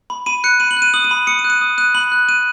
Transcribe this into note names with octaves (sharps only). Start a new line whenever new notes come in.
B5
B5 D#7
F#6 C#7
B5 D#7
F#7
F#6
D#7
D#6 F#7
D#7
B5
D#6 C#7
D#7
F#6
D#7
D#6
F#6 D#7
B5 F#7
F#6
F#6 D#7